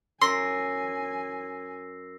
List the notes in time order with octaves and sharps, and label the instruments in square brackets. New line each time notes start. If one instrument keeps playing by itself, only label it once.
[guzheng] F#2 [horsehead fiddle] G#5 [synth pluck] C6 [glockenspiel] E6 A#6 C7